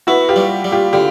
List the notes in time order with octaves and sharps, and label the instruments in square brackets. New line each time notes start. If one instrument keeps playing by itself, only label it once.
[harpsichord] B3 [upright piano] E4 F#4
[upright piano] F4 G4
[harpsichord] G3
G3
[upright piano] F4 G4
[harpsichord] D3 [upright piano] F4 G4